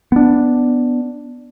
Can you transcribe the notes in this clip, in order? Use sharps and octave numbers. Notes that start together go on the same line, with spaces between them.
B3 D4